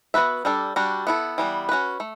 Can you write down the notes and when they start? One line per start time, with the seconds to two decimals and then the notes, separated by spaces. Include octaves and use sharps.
0.14 B3 F#4 B4 E5
0.45 G3 D4 A4 D5
0.76 G3 D4 F#4
1.07 B3 E4 A4
1.38 E3 G3 B3
1.69 C#4 F#4 B4
2.00 A3